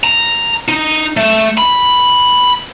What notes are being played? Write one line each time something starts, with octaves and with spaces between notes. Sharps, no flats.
A#5
D#4
A3
B5